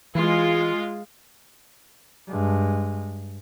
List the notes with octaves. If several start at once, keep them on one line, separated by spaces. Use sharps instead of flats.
E3 G#3 F4
G2 G#3